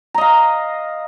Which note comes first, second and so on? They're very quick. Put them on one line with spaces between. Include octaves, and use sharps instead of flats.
A#5 D#5 F5